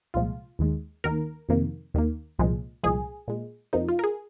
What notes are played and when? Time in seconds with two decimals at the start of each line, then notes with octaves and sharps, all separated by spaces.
0.14 C2 A#2 F3 G#3 F4
0.59 D#2 D#3 G#3
1.04 D#2 D#3 A#3 A#4
1.49 F2 C3 D#3 A#3
1.94 D#2 D#3 A#3
2.39 C2 A#2 F3 G#3
2.83 C2 A#2 F3 G#3 G#4
3.28 A#2 G#3
3.73 F2 C3 F3 A#3 D#4
3.88 F4
3.99 A#4
4.04 G#4